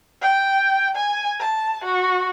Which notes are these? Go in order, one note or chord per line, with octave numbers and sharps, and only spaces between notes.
G5
G#5
A5
F#4